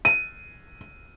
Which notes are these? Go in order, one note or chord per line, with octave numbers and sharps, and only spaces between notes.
D#7